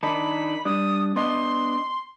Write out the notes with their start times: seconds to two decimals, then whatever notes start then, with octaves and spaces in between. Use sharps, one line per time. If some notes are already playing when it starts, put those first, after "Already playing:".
0.03 D#3 D4 D#4 B5
0.65 G3 D4 D#6
1.16 B3 D4 D#5 C6